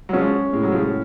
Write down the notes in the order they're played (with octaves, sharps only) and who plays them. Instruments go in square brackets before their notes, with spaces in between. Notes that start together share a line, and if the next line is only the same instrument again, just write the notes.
[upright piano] F#3
[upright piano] F3 G#3 [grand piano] C#4
[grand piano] A2 [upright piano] G#3
[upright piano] F#3
F3 G#3